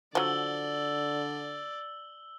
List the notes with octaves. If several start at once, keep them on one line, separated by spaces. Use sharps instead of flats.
D3 F3 F#3 D5 E6 F#7 G7